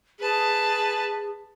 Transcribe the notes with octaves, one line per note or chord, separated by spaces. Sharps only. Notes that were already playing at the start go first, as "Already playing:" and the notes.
G#4 B4 A5